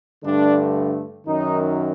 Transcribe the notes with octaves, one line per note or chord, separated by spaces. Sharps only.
G2 D3 A3 D4
F#2 D#3 F#3 D#4